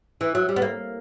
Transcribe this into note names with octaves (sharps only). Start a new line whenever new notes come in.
E3
F#3
G3
B3
A#3